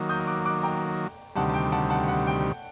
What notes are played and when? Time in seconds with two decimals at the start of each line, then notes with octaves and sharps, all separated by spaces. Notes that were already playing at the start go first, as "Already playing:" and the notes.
Already playing: D#3 F#3 A#3
0.09 D#6 G6
0.20 D#6
0.27 D6 F#6
0.45 D6 F#6
0.63 G5 A#5
1.35 D2 C3 D#3 G3 F#5 A5
1.49 A5
1.54 G5
1.72 F#5 A5
1.90 F#5 A5
2.08 F#5
2.27 G5